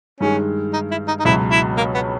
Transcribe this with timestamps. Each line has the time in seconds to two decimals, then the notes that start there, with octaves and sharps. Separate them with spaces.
0.20 G2 D#3 G#3 C#4
0.73 D#4
0.91 E4
1.07 D#4
1.19 D#4
1.25 C#2 B2 F#3 E4
1.51 E4
1.77 A#3
1.94 B3